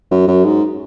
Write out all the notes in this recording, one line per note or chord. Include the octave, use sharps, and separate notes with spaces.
F#2
F#2
G#2